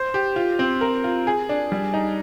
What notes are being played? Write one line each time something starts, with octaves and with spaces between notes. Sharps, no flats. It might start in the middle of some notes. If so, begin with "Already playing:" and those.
Already playing: C5
G4
F4
C4
A#4
F4
G#4
D4
G3
D#4